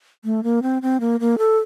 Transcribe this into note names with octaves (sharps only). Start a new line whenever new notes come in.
A3
A#3
C4
C4
A#3
A#3
A4